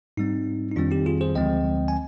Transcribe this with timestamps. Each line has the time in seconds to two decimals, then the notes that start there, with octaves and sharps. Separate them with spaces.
0.17 G#2 G3 C4 D#4
0.72 D#4
0.76 F2 D#3 G3 C4 D4 F4
0.91 D#4 G4
1.06 F4 G#4
1.21 G#4 C5
1.35 D2 D3 F3 G#3 C4 D#5 G5
1.88 G#5